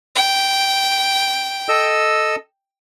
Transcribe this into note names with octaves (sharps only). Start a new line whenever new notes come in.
G5
A4 D#5 E6